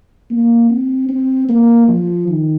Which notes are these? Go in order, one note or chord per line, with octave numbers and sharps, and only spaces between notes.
A#3
C4
C4
A#3
F3
D#3